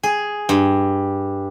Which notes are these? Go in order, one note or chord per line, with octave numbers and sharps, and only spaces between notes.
G#4
G2